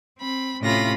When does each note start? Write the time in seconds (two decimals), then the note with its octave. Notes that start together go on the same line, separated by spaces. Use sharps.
0.18 C4 B5
0.61 A2 C3 C#4 F4 B5 A#6